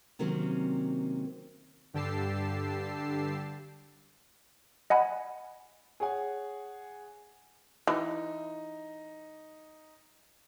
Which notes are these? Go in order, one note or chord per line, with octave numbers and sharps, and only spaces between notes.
C3 D#3 F#3 A#3 C4 C#4
G2 D3 G4 A5 E6 C7
D#5 F#5 G#5 B5
G#4 C#5 F#5 G#5
E3 D#4